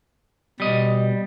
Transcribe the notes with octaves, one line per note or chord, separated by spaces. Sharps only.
B2 G3 D#5